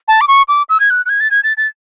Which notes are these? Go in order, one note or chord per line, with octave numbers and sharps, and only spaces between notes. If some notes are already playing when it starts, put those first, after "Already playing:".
A5
D6
C#6
D6
E6
G#6
F#6
F#6
G#6
A6
G#6
A6
A6